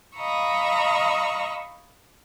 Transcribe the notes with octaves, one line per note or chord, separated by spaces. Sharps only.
D#5 F5 A#5 B5 C#6 E6